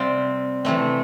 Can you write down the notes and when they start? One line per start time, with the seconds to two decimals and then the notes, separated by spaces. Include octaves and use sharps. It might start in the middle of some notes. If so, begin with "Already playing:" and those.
Already playing: C3 G3 C4 D5 F5 G5
0.65 C3 E3 A3 C4